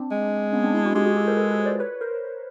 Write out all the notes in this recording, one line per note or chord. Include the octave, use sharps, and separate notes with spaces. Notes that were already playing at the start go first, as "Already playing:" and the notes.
Already playing: C4 D4
G#3
B3 C#4
C4 D4
D4 E4
E4 F#4
G#3 F4 G4
F#4 G#4
G4 A4
A#4 C5
A4 B4
A4 B4
C5 D5
B4 C#5
A#4 C5